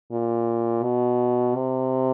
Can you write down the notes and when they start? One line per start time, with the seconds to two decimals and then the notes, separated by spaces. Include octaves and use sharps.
0.12 A#2
0.83 B2
1.55 C3